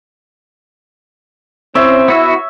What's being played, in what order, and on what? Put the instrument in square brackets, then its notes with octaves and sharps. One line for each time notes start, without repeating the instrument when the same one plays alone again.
[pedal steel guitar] C4 [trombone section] C#4 E4 [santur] C#5 E5
[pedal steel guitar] B3 F#4 E6 [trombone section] E4